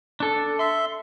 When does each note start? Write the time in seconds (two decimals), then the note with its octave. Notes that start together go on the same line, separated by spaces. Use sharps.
0.20 D4 A4
0.59 E5 C6